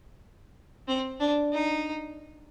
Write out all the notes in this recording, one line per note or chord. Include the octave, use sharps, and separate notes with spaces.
C4
D4
D#4